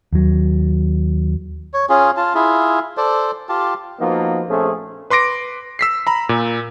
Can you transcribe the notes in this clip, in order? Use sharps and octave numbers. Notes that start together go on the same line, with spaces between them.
D#2 F#3
C#5
C#4 F4 G#4
F4 A5
E4 F4 G#4
A4 C5 D5
F4 G4 A5
F3 A#3 B3 D#4 F4 F#4
A#1 A3 C4 C#4 G#4 A4
B4 C6 D6 A#6 D7
E6 B6 C7
A#5 B5
A#2